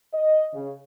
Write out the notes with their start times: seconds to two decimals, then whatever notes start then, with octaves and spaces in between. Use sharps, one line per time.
0.13 D#5
0.53 C#3